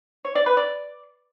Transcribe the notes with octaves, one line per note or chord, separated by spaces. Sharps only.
C#5
D5
B4
D5